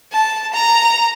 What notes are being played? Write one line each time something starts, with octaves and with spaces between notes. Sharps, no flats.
A5
A#5